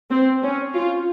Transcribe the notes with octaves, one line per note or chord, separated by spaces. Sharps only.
C4
C#4
F4